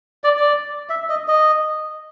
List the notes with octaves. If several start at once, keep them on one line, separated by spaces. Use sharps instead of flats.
D5
D5
E5
D#5
D#5